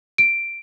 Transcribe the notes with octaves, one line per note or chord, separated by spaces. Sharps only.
D7